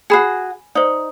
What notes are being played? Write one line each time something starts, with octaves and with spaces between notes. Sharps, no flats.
F#4 G#4 G#5 B5 C7
D#4 C5 D5